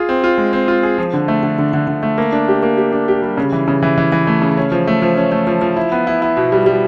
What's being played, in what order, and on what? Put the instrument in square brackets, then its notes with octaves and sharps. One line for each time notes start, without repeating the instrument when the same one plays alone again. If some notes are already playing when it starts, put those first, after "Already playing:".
Already playing: [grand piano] F4 G#4
C4
F4
G#3
C4
F4
G#4
F3
D3
A3
D3
D3
D3
D3
A3
A#3
D4
G4
A#3
G4
D4
G4
G3
C#3
E3
C#3
E3
E3
E3
A3
C#3
C#4
F3
A3
F3
C#4
A3
F3
F3
E4
B3
E4
E4
B2
G3
G3